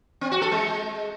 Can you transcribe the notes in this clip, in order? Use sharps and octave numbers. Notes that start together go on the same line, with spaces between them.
C4
F#4
A4
G#3